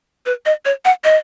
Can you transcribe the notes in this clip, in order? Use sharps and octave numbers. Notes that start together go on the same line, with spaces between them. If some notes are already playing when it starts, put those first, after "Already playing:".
B4
D#5
C#5
F#5
D#5